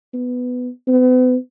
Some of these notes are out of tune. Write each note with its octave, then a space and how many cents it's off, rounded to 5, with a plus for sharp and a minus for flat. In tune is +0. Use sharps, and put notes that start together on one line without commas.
B3 +10
B3 +40